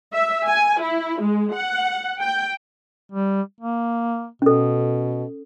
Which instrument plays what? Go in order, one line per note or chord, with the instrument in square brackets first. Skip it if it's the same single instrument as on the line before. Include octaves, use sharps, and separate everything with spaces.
[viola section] E5
G#5
E4
G#3
F#5
G5
[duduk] G3
A#3
[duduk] B2 [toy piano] C#4 A4